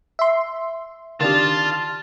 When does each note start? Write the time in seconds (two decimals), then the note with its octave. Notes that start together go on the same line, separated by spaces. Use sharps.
0.19 E5 C6
1.20 D#3 D4 F4 G4 A5